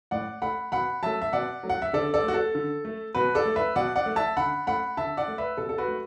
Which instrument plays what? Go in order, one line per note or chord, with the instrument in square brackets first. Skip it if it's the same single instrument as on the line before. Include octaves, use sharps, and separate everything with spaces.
[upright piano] A2 D5 F#5
A3 F#5 B5
B2 F#5 B5
F#3 A3 E5 A5
E5
B2 D5 F#5
F#3 A3
F#5
E5
D3 A4 D5
A4 D5
A3 F#4
A4
D3
A3
B2 F#4 B4
A4 D5
A3
B4 E5
B2 D5 F#5
D5 F#5
A3
E5 A5
D3 F#5 B5
A3 F#5 B5
D3 E5 A5
D5 F#5
A3
B4 E5
B2 A4
A4
F#4 B4
A3